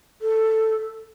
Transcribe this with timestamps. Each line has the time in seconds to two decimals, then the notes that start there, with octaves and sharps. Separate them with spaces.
0.22 A4